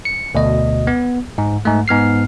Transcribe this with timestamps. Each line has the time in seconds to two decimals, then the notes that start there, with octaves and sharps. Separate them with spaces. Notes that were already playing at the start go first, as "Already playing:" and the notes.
0.05 C#7
0.35 D2 B2 D#5
0.87 B3
1.38 G#2
1.65 G#2 A3
1.88 G#2 B3 F6 C7